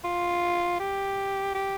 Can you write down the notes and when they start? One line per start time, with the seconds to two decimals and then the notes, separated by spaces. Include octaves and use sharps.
0.04 F4
0.80 G4
1.55 G4